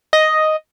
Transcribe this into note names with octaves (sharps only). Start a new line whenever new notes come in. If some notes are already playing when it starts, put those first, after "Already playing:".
D#5